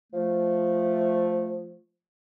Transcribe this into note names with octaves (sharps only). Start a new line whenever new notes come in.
F3 A3